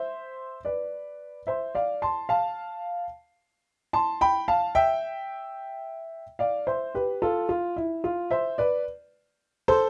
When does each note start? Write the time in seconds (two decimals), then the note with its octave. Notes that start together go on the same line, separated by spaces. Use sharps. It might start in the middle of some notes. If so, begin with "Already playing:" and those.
Already playing: C5 E5
0.65 B4 D5
1.47 C5 E5
1.75 D5 F5
2.02 A5 C6
2.29 F5 A5
3.93 A5 C6
4.21 G5 B5
4.48 F5 A5
4.75 E5 G5
6.39 D5 F5
6.67 C5 E5
6.95 G4 B4
7.22 F4 A4
7.49 F4
7.76 E4
8.04 F4
8.31 C5 E5
8.58 B4 D5
9.68 A4 C5